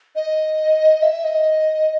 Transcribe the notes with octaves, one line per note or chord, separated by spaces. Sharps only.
D#5
E5
D#5